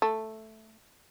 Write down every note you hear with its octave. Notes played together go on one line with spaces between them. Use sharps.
A3